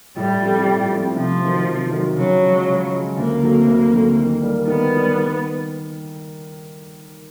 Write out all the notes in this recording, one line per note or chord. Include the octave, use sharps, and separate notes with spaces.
A2 G3
F3 A3 C4
A2
F3 A3 C4
C3 F3
D#3 F#3
C3
D#3 F#3
C#3 F#3
F3 G#3
C#3
F3 G#3
D2 A#3
D3 F#3 A3 C4
D2
D3 F#3 A3 C4
D#3
G3 A#3
D#3 B3
G3 A#3
D#3